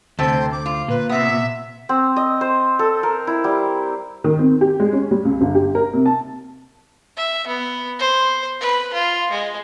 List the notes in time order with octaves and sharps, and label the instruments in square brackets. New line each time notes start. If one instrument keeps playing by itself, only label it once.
[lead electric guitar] D2 [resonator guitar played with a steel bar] C3 A3 G5 [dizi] C5
[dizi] D6
[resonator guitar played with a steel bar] F4
[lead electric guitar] A#2 [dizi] B4
[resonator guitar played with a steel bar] C3 B3 [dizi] E5
[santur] C4
D#5
C5
A4
A#4
E4
G3
[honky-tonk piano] D#3
C4
G4
G#3
C#4
G3
C#2
G1
G4
A#4
C3
A5
[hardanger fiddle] E5
B3
C5
B4
F4
G#3